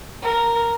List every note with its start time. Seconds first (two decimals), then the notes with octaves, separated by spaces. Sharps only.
0.22 A#4